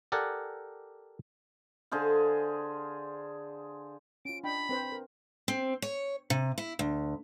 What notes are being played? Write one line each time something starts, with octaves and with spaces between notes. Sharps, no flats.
G4 A4 A#4 D5 F#5 G#5
D3 G#4 C5 F5
C#4 F4 D7
D4 D#5 G5 B5
C4 B4 C5
A#4
C4
C#5
C3
E4
D2